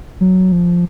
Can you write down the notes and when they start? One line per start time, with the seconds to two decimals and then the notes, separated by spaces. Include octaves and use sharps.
0.21 F#3
0.52 F3